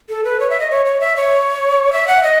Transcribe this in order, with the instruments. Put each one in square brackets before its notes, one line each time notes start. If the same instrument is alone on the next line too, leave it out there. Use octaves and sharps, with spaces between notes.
[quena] A4
B4
C#5
E5
D#5
C#5
C#5
E5
C#5
E5
F#5
D#5